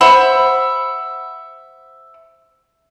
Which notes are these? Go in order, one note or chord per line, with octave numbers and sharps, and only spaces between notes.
C5 E5 F#5 B5